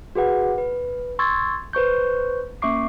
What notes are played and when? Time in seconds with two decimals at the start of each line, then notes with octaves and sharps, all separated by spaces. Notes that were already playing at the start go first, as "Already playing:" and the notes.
0.15 F#4 G#4 B4 F#5
0.58 B4
1.19 C6 C#6 E6 G#6 A6
1.73 B4 C5 C#6 G6
2.62 A#3 C#4 E5 C#6 D6 C7